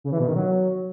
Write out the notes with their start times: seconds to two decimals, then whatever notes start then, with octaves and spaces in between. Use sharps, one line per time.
0.04 C#3
0.12 E3
0.20 B2
0.28 D#3
0.36 F#3